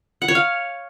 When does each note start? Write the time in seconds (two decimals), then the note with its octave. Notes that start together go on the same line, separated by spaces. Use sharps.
0.22 F#5
0.28 C#5
0.35 F5